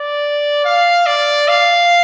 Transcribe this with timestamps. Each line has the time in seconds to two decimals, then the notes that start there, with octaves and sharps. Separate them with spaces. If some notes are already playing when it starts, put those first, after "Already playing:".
Already playing: D5
0.65 F5
1.06 D5
1.48 F5